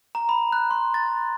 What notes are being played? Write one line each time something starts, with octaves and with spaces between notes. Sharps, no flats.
A#5
B5
F#6
C6
A6